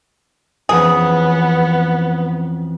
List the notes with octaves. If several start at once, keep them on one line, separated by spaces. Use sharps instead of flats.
F2 E3 B3 C#4 G#4